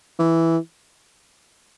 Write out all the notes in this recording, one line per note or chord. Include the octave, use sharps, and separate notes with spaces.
E3